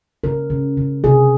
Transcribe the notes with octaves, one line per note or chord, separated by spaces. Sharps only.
C#3 A#4
C#3
C#3
C3 G#4